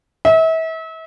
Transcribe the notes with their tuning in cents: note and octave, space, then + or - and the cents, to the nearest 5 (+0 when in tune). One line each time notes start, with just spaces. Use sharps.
E5 -35